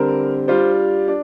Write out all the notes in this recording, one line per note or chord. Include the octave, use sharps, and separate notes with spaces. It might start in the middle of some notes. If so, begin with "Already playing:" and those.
Already playing: D3 G3 C4 A#4
G3 D4 F4 C5
D4